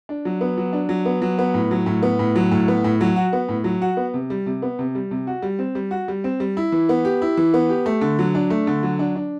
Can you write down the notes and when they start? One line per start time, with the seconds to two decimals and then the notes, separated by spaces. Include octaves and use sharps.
0.09 D4
0.25 F#3
0.41 B3
0.58 F#3
0.73 D4
0.89 F#3
1.06 B3
1.22 F#3
1.39 B3
1.54 A2
1.71 F#3
1.86 A2
2.03 B3
2.19 A2
2.36 F#3
2.51 A2
2.68 B3
2.84 A2
3.01 F#3
3.16 F#4
3.33 B3
3.48 A2
3.64 F#3
3.82 F#4
3.97 B3
4.14 C3
4.30 G3
4.46 C3
4.62 B3
4.79 C3
4.95 G3
5.11 C3
5.27 F#4
5.42 G3
5.59 C4
5.75 G3
5.91 F#4
6.08 G3
6.24 C4
6.40 G3
6.57 E4
6.72 E3
6.89 B3
7.05 G4
7.22 E4
7.37 E3
7.54 B3
7.69 G4
7.86 A3
8.01 D3
8.19 F#3
8.35 D4
8.50 A3
8.67 D3
8.83 F#3
8.99 D4
9.15 D4